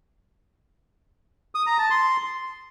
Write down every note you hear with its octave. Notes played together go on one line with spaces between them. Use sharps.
D#6
A#5
A5
C6